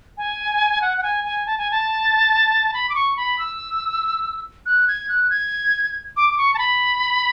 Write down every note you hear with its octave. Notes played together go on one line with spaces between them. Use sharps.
G#5
F#5
F#5
G#5
G#5
A5
G#5
A5
B5
D6
C#6
B5
E6
F#6
G#6
F#6
G#6
D6
D6
C#6
A5
B5